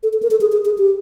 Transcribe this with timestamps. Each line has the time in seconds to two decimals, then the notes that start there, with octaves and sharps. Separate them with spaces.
0.03 A4
0.13 A4
0.22 A#4
0.31 A4
0.41 G#4
0.52 G#4
0.65 G#4
0.78 G4